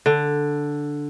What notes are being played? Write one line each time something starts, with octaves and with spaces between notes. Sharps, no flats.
D3